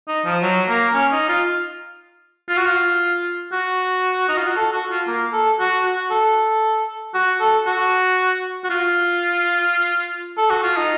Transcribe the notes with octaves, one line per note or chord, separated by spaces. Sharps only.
D#4
F3
F#3
A#3
C#4
D#4
F4
F4
F#4
F4
F#4
D#4
F4
F#4
A4
F#4
F4
A#3
A4
F#4
F#4
A4
F#4
A4
F#4
F#4
F4
A4
F#4
F4
D#4